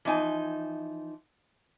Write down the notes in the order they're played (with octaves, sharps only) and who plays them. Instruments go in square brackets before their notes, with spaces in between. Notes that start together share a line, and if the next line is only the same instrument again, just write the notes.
[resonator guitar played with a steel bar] E3 F3 D#4 G#5